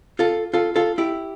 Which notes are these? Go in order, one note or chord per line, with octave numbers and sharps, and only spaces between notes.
F4 A4
F4 A4
F4 A4
E4 G4